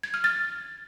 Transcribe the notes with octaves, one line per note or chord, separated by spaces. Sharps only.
G#6
F6
A6